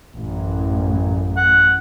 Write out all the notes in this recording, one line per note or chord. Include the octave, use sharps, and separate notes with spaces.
A1 F#2
F#5